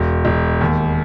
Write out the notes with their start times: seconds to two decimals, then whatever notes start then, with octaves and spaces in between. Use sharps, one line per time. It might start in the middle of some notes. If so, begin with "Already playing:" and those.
Already playing: E1
0.25 E1
0.61 D#2